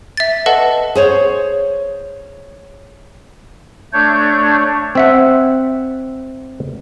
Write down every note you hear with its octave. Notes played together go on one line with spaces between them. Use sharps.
E5 A6
A4 B4 D#5 F#5 A5
G#4 C5 C#5
A3 D4 C#5 G6
C4 E5 F#5